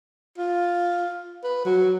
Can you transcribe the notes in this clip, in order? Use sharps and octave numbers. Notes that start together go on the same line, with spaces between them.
F4
B4
F#3